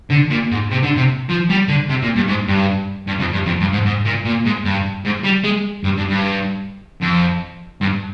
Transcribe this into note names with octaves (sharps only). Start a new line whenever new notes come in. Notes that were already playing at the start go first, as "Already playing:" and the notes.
D3
A#2
G#2
C3
D3
C3
F3
G3
D3
C3
A#2
G2
G#2
G2
G2
F2
G2
F2
G2
G#2
G#2
A#2
A#2
G#2
G2
G#2
G3
G#3
G2
G2
G2
F2
G2